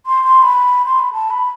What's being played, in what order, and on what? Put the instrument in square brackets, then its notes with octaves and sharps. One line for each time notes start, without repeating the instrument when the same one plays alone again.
[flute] C6
C6
B5
C6
B5
A5
B5